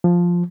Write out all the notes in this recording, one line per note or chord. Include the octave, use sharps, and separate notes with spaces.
F3